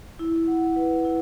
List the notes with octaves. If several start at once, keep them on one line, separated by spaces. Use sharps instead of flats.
E4
F#5
B4
E4